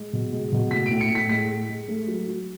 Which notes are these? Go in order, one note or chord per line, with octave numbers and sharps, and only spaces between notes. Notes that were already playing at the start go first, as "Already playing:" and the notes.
Already playing: G#3
B2
G#3
B2
A2 B6
D7
A2
C#7
A2 B6
G#3 B6
G#3
G#3
A3
F#3
F#3